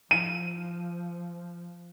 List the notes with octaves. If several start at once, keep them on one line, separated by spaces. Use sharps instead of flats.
F3 D#7